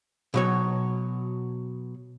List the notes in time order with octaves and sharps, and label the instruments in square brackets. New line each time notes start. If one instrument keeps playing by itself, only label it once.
[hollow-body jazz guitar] B2 F#3 C#5